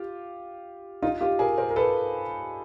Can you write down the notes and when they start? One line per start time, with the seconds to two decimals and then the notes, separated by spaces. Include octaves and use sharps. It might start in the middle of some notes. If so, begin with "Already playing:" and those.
Already playing: F4 G4
1.02 D#4 F4
1.21 F4 G4
1.39 G#4 A#4
1.58 A#4 C5
1.70 A#4
1.76 A4 B4